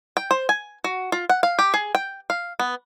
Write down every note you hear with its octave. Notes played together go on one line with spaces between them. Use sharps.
G5
C5
G#5
F#4
F4
F#5
F5
G4
G#4
G5
F5
B3